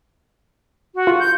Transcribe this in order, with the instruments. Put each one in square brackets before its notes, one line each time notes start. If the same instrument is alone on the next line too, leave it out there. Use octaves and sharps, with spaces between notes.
[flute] F#4
[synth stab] F4
[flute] G6